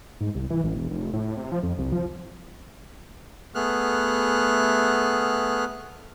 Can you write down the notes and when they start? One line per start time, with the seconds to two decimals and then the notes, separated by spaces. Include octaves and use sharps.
0.21 G#2
0.35 C2
0.50 E3
0.64 A1
0.76 E1
0.90 F1
1.13 A2
1.37 C3
1.52 F3
1.63 F2
1.78 C2
1.92 F3
3.55 A3 B3 G#4 F6 F#6